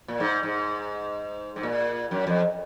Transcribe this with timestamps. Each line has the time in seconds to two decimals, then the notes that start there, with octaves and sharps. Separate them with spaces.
0.08 A#2
0.20 G#2
0.43 G#2
1.56 G#2
1.63 A#2
2.11 F#2
2.27 F2